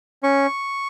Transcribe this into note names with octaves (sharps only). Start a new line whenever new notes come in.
C#4 C#6